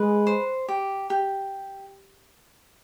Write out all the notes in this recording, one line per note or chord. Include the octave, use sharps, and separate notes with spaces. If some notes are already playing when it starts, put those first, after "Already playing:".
Already playing: G#3 B4
C5
G4
G4